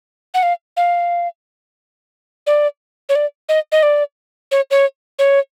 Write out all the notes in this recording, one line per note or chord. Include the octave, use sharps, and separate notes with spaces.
F#5
F5
F5
D5
C#5
D5
D#5
D#5
D5
C#5
C#5
C#5